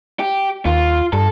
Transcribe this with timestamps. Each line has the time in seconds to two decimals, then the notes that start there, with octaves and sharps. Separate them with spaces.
0.20 G4
0.66 D#2 F4
1.13 G2 A4